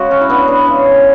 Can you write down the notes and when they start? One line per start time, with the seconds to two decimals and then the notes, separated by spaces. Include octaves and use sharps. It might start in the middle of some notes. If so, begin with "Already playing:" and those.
Already playing: C#3 G#3 F#4
0.11 C#4
0.21 E4
0.30 B3 D4
0.48 B3 D4
0.66 C#3 G#3 C#4